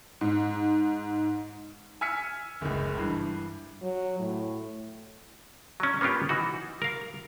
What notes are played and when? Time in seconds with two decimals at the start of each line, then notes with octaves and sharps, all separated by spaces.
0.21 G#2
2.01 G#5 E6 F6 B6 C#7
2.61 F#1 C#2
2.97 G2 E3
3.82 F#3
4.19 A2
5.80 F#3 C#4
6.01 A#3 B3 C#4 F4 G4
6.29 E3 D#4 F#4
6.82 A#4 F5